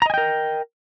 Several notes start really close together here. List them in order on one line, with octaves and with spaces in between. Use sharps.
A#5 D#5 G#5 G5 A#4